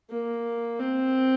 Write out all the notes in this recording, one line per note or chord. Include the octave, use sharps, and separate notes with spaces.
A#3
C4